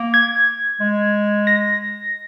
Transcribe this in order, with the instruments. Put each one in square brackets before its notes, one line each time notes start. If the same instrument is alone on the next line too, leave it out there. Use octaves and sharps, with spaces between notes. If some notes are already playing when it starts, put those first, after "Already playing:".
Already playing: [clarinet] A#3
[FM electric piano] G#6
[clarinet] G#3
[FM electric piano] A#6